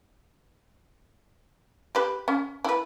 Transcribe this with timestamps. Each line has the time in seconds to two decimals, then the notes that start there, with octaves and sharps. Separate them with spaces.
1.95 G4 B4
2.28 C#4
2.64 E4 B4